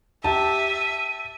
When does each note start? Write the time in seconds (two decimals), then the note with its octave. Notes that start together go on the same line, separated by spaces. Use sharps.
0.24 G4 E5 A5 D#7